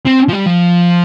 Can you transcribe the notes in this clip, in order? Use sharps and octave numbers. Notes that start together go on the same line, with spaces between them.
C4
F3
G3
F3